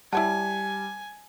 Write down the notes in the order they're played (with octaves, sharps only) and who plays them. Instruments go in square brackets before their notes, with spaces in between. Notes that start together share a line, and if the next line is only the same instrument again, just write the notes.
[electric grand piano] G3 [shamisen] E4 C#5 F#5 [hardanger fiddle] G#5 [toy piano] A5